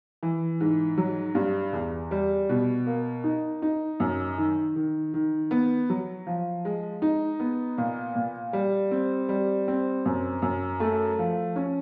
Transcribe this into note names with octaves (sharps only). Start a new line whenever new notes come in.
E3
G#2
F#3
G2
E2
G3
B2
A#3
D#4
D#4
F#2
D#3
D#3
D#3
B3
F#3
F3
G#3
D#4
B3
A#2
A#2
G3
C4
G3
C4
F#2
F#2
A3
F3
C#4